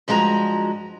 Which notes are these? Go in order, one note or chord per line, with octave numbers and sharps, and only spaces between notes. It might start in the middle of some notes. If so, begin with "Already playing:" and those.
G2 F3 G#3 F#4 A#5